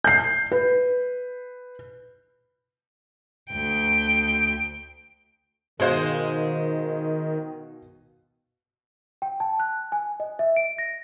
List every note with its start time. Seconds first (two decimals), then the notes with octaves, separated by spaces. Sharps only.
0.04 G6 C7
0.52 B4
3.51 D2 G5
5.80 B2 D#3 G#3 C5 D#5 F5
9.22 G5
9.40 A5
9.60 F#6
9.92 G#5
10.20 D#5
10.39 E5
10.56 D7
10.78 A#6